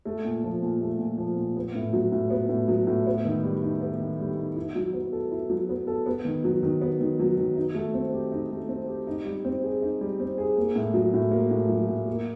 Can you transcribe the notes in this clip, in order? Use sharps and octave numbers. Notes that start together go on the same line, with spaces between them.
A3
A#2
F3
A#2
A3
A#2
F3
A#2
B3
A2
F#3
A2
B3
A2
F#3
A2
B3
D#3
G3
D#4
B3
D#3
G3
D#4
E4
F#3
B3
A4
E4
F#3
B3
A4
B3
D#3
F#3
D#3
B3
D#3
F#3
D#3
D#4
A3
C4
G4
D#4
A3
C4
G4
D#4
G3
C4
G#4
D#4
G3
C4
G#4
A#3
A2
F#3
A2
A#3
A2
F#3
A2
A#3